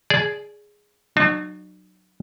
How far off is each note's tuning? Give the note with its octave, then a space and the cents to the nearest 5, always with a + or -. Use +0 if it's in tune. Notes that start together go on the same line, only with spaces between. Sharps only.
G#4 +0 D5 -15 G#5 +45
F#3 +0 D#4 -45 A5 -15